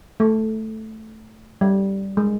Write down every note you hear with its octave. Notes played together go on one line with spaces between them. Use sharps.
A3
G3
G#3